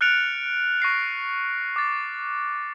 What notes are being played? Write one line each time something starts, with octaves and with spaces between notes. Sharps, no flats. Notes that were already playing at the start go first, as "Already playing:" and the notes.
F6 F#6 A6 C#7 D7 F7
C#6 A#6 C7 F7
D6 A6